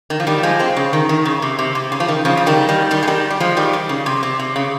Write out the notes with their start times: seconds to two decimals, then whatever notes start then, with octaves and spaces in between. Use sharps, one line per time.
0.10 D#3
0.20 F3
0.27 D#3 G3
0.43 F3 G#3
0.59 G#3 C4
0.77 C#3
0.93 D#3
1.09 D#3
1.25 C#3
1.42 C3
1.59 C3
1.75 C3
1.92 C#3
2.00 F3
2.08 D#3
2.25 C#3 F3
2.37 F3
2.46 D#3 G3
2.69 D#3 G3
2.91 D#3 G3
3.03 G#3
3.07 D#3 G3
3.30 G3
3.40 F3 G#3
3.57 D#3 G3
3.73 D#3
3.89 C#3
4.06 C3
4.23 C3
4.39 C3
4.56 C#3